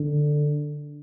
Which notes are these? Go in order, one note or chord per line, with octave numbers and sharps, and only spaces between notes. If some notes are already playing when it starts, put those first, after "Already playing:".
Already playing: D3